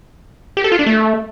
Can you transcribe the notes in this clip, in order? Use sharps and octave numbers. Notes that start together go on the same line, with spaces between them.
G4
A4
F4
D4
A3